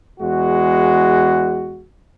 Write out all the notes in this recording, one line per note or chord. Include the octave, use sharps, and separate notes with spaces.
E2 G#3 F#4